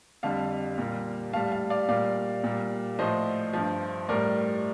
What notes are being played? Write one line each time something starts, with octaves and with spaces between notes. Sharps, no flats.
F2 D3 G3 F5 A5
A#2 G3
A2 G3 F5 A5
F5 A5
D5 F5
A#2 G3 D5 F5
A#2 G3
A2 F3 C5 D#5
G2 F3
A2 G3 A#4 D5